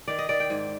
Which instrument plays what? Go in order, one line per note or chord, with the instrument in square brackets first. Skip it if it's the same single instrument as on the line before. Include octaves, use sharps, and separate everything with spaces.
[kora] D#3 D5
D#5
D#3 D5
G5
G#2